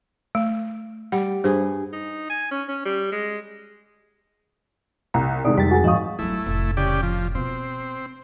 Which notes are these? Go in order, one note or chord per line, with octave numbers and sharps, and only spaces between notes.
A3
G3 F#5
G2 G#4 C5
D#4
G#5
C#4
C#4
G3
G#3
C2 A#5
C3 D#3 G#3 D5 D#6
F2 G3 G4 A6 B6
F#4 G#4 F#5 G#5
G#1 G#2 F3 D#5 F5 C#6 D#6
G1 F#3 A3 E4
F1 A2
C#3 G4 D5
F3
B2 C4